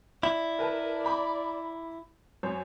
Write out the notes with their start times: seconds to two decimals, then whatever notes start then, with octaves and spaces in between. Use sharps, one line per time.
0.23 E4 D5
0.59 A#4 B4 A5
1.05 A#5 B5 D6
2.43 F#2 C5 C#5